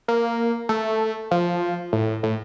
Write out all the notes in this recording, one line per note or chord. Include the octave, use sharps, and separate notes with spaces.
A#3
A3
F3
A2
A2